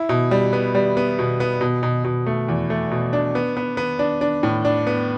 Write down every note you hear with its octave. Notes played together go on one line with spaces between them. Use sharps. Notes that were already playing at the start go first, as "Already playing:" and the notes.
Already playing: E4
B2
G3
B3
G3
B3
B2
B3
B2
B2
B2
A3
E2
A3
B2
D4
B3
B3
B3
D4
D4
A2
D4
B3